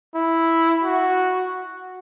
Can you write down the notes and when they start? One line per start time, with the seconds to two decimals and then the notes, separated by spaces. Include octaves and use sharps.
0.15 E4
0.84 F#4